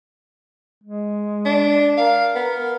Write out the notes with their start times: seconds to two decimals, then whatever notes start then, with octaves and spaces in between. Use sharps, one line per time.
0.84 G#3
1.45 D4
1.97 A#4 F5
2.35 B3 A#4